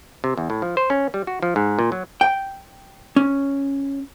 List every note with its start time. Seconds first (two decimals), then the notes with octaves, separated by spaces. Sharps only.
0.24 C3
0.37 E2
0.50 A2
0.62 F3
0.77 C5
0.90 C#4
1.14 G3
1.27 F#4
1.43 F3
1.56 G#2
1.79 A#2
1.92 F#3
2.21 G5
3.16 C#4